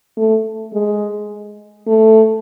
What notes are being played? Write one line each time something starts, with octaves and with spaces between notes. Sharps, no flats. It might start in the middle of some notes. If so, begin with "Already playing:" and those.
A3
G#3
A3